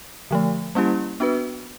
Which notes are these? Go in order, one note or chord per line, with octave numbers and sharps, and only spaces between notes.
D3 F3 A3
G3 A#3 C#4 E4 G4
B3 D4 F#4 B4